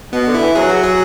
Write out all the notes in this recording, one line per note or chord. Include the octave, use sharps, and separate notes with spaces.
B2 B3
D3
E4
E3
F#3 G#4
F#4
G#4